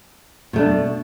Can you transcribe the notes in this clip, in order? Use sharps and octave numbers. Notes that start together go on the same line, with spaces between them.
B2 A3 D4